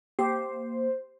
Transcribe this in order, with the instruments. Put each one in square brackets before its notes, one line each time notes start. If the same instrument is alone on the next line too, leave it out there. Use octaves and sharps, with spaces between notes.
[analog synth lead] A#3 [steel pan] G4 [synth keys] C5